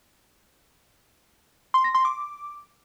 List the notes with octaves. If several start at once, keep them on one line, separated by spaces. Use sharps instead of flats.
C6
A#6
C6
D6